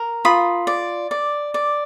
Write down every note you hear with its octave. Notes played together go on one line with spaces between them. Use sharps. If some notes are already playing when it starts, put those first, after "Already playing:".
Already playing: A#4
F4 B5 D#6
D5
D5
D5